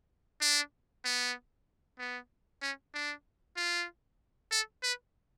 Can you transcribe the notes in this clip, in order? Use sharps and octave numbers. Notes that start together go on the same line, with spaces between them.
D4
B3
B3
C#4
D4
F4
A4
B4